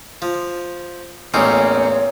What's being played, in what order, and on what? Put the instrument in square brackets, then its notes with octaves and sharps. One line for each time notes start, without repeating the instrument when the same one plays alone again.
[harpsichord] F3
[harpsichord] A1 E2 D#4 [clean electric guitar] A#3 C4 C#4 [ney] C#5